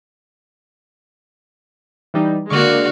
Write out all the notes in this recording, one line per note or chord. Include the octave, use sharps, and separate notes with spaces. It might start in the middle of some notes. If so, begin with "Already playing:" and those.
E3 G3 D#4
D3 G#3 A#3 F#4 F5 C#6 D6